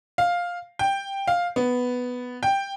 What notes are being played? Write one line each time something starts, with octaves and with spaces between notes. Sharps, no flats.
F5
G5
F5
B3
G5